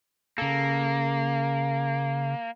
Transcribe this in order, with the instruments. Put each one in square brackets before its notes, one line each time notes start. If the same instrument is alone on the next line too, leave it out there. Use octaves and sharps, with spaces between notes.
[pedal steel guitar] C#3 A4 [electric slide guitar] A#3